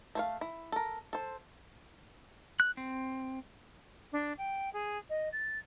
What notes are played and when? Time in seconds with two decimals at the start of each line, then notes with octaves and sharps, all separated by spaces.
0.15 A3 C5 F5
0.41 E4
0.72 A4 A#4
1.13 A4 C5
2.60 F#6
2.77 C4
4.12 D4
4.38 G5
4.73 G#4
5.09 D#5
5.32 A6